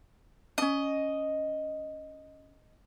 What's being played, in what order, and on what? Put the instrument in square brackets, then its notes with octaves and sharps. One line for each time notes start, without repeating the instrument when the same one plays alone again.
[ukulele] C#4 D4 [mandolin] D#5